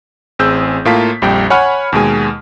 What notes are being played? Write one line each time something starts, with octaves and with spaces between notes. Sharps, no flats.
A1 C4 G#4 E6 G6
A2 A#3 F4 A5 B6
A#1 F2 G3 G5
C#5 F#5 G#5 B5 F6
D#2 B2 G#3 G#5